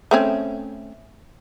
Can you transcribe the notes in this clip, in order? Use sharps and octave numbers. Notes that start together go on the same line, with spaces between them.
A3 C4 C#4